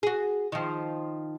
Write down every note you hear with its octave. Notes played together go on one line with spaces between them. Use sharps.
F#4 G#4
D#3 F3